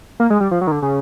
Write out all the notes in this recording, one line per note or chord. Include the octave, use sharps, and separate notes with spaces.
A#3
G#3
G3
F3
F#3
D#3
D3
C#3